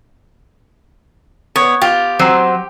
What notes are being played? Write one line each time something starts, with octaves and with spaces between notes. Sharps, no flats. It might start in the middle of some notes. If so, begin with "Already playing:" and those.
B3 C#5
F4 G4
F#3 C4 C5